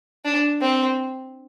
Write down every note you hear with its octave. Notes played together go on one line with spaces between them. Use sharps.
D4
C4